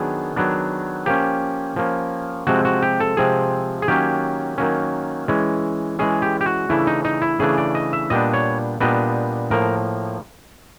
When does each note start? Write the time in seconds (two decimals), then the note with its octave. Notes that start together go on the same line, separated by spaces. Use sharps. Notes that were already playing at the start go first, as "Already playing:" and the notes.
Already playing: D#3 F#3 B3 D4 G#4
0.36 D#3 F#3 B3 D4
1.06 F3 A#3 C#4 G4
1.76 F3 A#3 C#4
2.47 C3 F3 G#3 C4 F#4
2.65 F#4
2.82 G4
3.00 A4
3.17 C3 F3 G#3 C4 G#4
3.82 G#4
3.88 D#3 F#3 A#3 C#4 G4
4.58 D#3 F#3 A#3 C#4
5.28 E3 G#3 C#4
5.99 E3 G#3 C#4 G#4
6.22 G4
6.41 G4
6.46 F#4
6.69 C#3 E3 A3 D4 E4
6.87 D#4
7.05 D#4
7.22 E4
7.39 C#3 E3 A3 D4 G#4
7.58 D5
7.75 D#5
7.93 E5
8.10 A#2 G3 B3 D4 D#5
8.34 C#5
8.80 A#2 G3 B3 D4 D#5
9.50 A2 F3 A#3 A#4